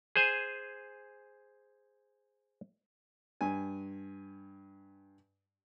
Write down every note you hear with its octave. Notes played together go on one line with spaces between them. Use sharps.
G#4 C5 G#5
G2 G#5